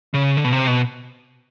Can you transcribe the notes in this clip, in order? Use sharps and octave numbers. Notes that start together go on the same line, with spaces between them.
C#3
D3
B2
C3
B2